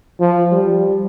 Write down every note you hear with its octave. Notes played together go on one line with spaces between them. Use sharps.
F3
G3